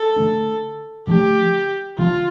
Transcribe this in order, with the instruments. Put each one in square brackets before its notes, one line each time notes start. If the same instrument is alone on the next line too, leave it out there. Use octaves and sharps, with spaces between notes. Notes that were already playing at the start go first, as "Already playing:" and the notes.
Already playing: [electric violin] A4
[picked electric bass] D3 F3 A3 D4
[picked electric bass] D3 F3 A3 D4 [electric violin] G4
[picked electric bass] D3 F3 A3 D4 [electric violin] F4